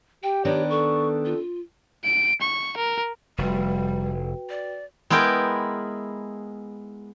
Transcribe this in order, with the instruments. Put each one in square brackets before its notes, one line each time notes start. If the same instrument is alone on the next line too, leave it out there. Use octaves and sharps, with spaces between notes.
[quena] G4 [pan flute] G5
[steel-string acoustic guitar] D#3 B3 D4 [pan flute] C#5
[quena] A4 [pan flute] C#6
[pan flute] F4
[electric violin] D7
C#6
A#4
[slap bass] F1 [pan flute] G3 [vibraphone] F#4 B4 G5
[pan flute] D5
[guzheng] G#3 B3 E4 A#4 G5